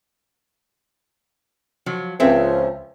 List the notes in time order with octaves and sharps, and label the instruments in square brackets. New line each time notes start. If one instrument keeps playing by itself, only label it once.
[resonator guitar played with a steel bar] F3 F#3
[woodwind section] C#2 F3 [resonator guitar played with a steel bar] C4 C#4 E5